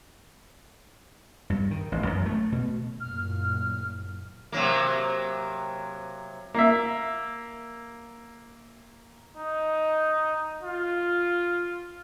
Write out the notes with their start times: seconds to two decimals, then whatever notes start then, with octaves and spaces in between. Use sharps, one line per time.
1.50 G2
1.71 D#3
1.92 A1
2.07 F#2
2.26 A3
2.52 B2
3.00 F#1 F#2 A#2 F6
4.52 C3 F#3 A#3
6.55 A#3 E5
9.37 D#4
10.62 F4